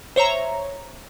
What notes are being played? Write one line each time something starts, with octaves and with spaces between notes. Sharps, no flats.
C5 C#5 E5 A#5